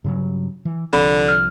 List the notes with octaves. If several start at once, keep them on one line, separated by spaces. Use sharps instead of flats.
G2 C#3 F#3
E3
C2 D3 F3 C4 B5
F6